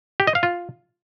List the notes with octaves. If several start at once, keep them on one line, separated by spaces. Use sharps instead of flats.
G4
D#5
F5
F4